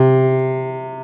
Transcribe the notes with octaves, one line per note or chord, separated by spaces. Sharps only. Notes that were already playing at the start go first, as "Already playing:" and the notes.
Already playing: C3